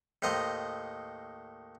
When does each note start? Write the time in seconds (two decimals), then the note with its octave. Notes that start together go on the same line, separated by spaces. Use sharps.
0.22 D#2 A2 C5 D#5 A#5